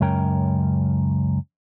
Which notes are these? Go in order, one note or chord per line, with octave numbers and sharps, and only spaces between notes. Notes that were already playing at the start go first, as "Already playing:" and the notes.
C#2 F#2 C#4 A#4 G5